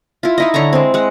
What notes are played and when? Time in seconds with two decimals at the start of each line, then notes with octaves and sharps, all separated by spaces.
0.23 E4 F4
0.38 D#4 E4 D#5
0.54 D3 C#5 A#5 C#6
0.73 G#3 C4
0.94 G#3 F#5